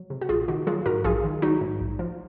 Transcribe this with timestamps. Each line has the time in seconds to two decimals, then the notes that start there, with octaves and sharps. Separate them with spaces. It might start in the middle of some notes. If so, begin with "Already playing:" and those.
Already playing: F#3
0.10 C3
0.21 F#4
0.29 A#1 F4 G#4
0.48 D#3 D#4 F#4
0.67 F#3 F4 G#4
0.86 G#2 F#4 A#4
1.04 A#1 F4 G#4
1.24 D#3
1.42 F#3 D#4 F#4
1.61 G#2
1.80 A#1
1.99 F3